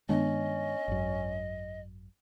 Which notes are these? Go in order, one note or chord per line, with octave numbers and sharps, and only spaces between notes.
G2 D#3 G#3 B3 C#4 D4 D#5
G#1 F#2